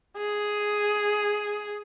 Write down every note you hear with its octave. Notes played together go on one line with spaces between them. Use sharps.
G#4